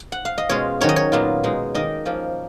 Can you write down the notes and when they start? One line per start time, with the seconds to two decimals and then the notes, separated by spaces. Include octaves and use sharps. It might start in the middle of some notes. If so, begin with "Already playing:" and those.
Already playing: G#5
0.12 F#5
0.25 F5
0.38 D#5
0.49 B2 G#3 C#4 F4 C#5
0.81 D#3 F#3 C#4 C#5
0.89 D#5
0.96 C#5
1.12 A#2 F#3 B3 F4
1.43 B2 G#3 D#4
1.74 D#3 A#3 D#4 D#5
2.05 F3 A#3 C#4